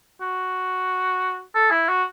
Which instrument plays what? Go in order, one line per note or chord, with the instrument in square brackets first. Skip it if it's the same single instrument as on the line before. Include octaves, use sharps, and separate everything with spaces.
[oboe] F#4
A4
E4
F#4